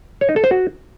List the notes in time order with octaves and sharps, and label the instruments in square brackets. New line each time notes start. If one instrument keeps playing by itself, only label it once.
[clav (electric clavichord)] C#5
D#4
A4
C5
F#4